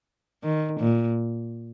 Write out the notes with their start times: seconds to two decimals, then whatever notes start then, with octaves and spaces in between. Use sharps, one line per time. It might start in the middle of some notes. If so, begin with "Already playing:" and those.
0.44 D#3
0.80 A#2